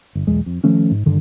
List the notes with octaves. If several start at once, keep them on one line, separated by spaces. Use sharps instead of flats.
G1
B1 E2 G#3
F2
D#3 F3 A3 C#4
G#2
G2 D3 D#3